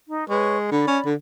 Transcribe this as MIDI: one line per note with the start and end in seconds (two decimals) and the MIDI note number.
0.08 0.27 63
0.30 0.72 56
0.30 0.57 71
0.30 0.57 73
0.30 0.57 85
0.72 0.83 50
0.72 1.08 74
0.72 1.08 83
0.88 1.00 61
1.06 1.15 50